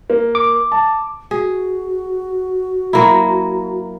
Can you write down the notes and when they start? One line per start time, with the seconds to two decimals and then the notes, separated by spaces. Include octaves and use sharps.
0.10 A#3
0.35 D6
0.72 A5
1.31 F#4 G#4
2.93 F#3 A#3 E4